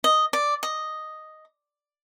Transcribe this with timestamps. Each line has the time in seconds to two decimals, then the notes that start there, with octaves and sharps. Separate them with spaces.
0.04 D#5
0.33 D5
0.63 D#5